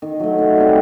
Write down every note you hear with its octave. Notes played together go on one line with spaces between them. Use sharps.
D#3
F#3 A3
D#3
G3 C4